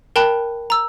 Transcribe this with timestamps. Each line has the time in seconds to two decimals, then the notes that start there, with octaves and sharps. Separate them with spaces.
0.16 A#4 G5 A5 B5 F#6
0.70 A#5 E6